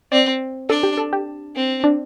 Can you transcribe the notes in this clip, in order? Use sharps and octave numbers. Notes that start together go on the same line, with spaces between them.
C4 D5
D4 A4
G4
A4
G4
C4
D4